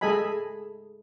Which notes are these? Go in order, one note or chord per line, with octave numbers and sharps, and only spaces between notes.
G#3 G#4 A4 D#5 G#5 B5